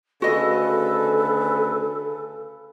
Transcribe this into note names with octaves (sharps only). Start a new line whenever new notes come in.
D2 C#3 F#4 A4 B4 D#5